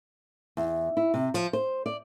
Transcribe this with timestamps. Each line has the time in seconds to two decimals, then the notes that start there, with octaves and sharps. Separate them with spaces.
0.57 E2
0.97 E4
1.14 C3
1.34 F3
1.53 C5
1.86 D5